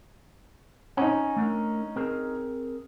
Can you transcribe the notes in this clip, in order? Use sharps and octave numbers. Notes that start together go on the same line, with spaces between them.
C#4 D#4 F#5 G#5
A3 D4 A#4
C4 G#4 A#4